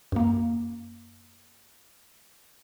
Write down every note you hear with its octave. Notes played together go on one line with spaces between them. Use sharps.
F#2 A#3